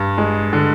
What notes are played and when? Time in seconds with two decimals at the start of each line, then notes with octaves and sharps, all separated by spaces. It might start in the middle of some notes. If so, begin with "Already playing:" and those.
Already playing: G2
0.18 G#3
0.53 D3